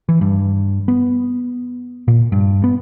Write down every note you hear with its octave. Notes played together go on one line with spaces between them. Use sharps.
E3
G2
B3
A#2
G2
B3